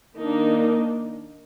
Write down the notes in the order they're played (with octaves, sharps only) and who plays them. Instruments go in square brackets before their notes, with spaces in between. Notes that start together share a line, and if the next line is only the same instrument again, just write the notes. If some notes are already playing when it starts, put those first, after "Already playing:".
[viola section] D#3 A#3 D4 D#4